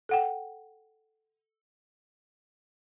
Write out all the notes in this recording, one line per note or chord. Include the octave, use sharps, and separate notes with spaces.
A4 F#5 G5